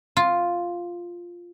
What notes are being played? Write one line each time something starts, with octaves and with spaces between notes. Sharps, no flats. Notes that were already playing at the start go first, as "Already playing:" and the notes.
F4